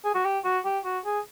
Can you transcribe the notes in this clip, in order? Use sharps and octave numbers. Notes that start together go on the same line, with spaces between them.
G#4
F#4
G4
F#4
G4
F#4
G#4